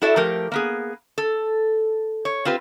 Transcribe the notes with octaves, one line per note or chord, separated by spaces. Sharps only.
E4 F#4 A4 D5 E5
F3 A3 G4 A#4
A#3 B3 G#4
A4
C#5
C4 F4 G4 B4